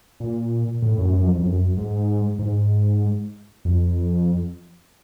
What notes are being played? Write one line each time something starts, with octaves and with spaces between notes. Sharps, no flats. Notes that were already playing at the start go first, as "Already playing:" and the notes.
A#2
A2
F#2
F#2
F2
F2
F#2
G#2
G#2
F2